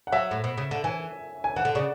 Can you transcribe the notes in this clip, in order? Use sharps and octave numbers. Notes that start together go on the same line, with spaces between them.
F#5
F#3 E5
A2
B2
C#3
D3
E3 G#5
G#5
E3 F#5
D3
C#3 D5